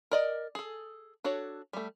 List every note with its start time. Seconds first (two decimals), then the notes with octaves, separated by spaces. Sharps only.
0.11 A#4 D5 D#5
0.55 G#4 A4
1.24 D4 F#4 A4 C#5
1.73 G3 A3